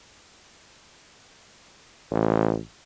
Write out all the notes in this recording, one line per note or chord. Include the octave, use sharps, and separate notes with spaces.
A1